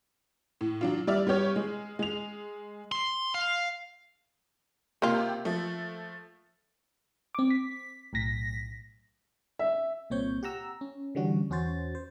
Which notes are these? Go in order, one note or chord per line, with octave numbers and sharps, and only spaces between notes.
A2
F#3 D4 F4
G3 D5 E5 F6
G3 B3 G4 C#5
G#3
G#3 F7
C6
F5
C#2 C3 A#3 F4 G4
F3 A3
C4 D6
B6
B1 A2 A#6 B6
E5
C2 A#2 C4 C#5 G6
G4 F#5 A#5 E6
C#4
D3 E3 G3 C#4 F#4
E2 C#4 F#4 C5 A6
C5